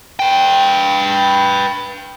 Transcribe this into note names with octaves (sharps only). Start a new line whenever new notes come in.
B4 G5